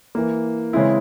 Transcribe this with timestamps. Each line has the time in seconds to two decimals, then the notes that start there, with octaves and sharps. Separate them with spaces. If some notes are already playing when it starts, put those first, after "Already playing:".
0.15 E3 A#3
0.73 C#3 E3 G#3 C4 E4